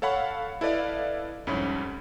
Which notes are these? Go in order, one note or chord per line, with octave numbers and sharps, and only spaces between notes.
A4 C#5 F5 F#5 B5 C#6
E4 A4 B4 D5 D#5 F5
C2 F2 G#2 C#4 B5